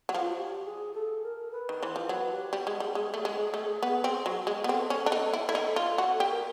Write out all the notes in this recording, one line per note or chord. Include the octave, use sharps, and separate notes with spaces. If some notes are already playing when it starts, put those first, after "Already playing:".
F#3
F3
F4
F#4
G4
G#4
A4
A#4
B4
D#3
E3 C5
F3
F#3 B4
G4
G3 G4
G#3
G#4
G3
G#3 G#4
A3
G#3
A3
B3
C4
F#3
G#3
B3
C4 A4
C#4
D4
D#4
E4
E4
D#4
F4
F#4
G4 A4
A#4